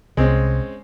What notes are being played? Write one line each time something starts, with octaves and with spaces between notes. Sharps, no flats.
C2 G#3 C4 C#4